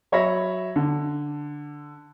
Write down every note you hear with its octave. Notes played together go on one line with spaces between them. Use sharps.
F#3 C#5 E5 B5 A#6
D3